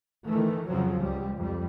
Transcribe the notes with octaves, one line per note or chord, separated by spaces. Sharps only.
D#3 E3 A3
F2 C#3 F3 F#3
C#2 G3
F2 G3